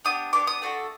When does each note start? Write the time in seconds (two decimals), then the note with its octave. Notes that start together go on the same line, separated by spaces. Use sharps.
0.05 B3 D4 G4 D#6
0.33 B3 D4 G4 D6
0.47 D#6
0.62 A3 D4 F#4 A4